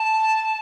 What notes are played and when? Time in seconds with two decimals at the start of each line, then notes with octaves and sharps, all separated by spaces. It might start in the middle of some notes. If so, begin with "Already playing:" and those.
Already playing: A5